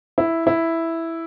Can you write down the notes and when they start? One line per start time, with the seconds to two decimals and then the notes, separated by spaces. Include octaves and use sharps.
0.18 E4
0.47 E4